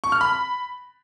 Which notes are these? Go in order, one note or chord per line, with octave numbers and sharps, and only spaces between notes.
C#6
F6
B5